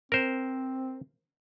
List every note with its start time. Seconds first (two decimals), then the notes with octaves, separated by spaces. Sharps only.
0.12 C4 A#4 C5